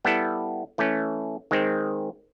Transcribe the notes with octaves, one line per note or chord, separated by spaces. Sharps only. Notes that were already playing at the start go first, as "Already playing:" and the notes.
G3 B3 E4 A4
E3 A3 C#4
D#3 G#3 C4